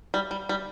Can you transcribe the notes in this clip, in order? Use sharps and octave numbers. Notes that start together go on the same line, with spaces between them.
G3
G3
G3